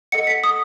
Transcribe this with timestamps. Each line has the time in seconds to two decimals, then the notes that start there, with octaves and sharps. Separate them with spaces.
0.12 A4 D#5 F#5 C#7
0.27 B6
0.44 D#6